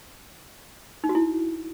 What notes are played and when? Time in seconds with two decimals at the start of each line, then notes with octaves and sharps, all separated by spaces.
1.04 D#4
1.09 F#4
1.15 E4